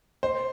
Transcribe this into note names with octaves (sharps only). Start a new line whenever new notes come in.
C5